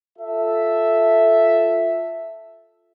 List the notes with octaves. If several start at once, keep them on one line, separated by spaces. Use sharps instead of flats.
F4 A4 E5